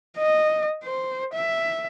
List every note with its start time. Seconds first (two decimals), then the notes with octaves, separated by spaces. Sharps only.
0.17 D#5
0.83 C5
1.33 E5